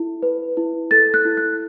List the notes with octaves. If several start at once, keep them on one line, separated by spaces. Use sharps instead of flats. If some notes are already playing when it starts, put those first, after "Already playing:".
Already playing: E4 A4
B4
E4
A4 A6
F#6
E4
F#6